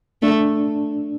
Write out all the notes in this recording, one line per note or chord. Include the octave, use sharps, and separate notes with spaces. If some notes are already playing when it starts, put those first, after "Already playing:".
A3 D4